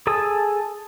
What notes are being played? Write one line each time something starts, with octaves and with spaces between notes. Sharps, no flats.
G#4 A4 G#5 A5 D#6